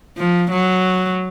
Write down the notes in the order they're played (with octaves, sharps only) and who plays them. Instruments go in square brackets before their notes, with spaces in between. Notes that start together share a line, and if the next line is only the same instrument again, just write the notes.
[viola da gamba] F3
F#3